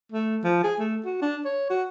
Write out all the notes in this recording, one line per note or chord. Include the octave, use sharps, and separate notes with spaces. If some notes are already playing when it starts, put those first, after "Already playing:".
A3
F3
G#4
A3
F#4
D4
C#5
F#4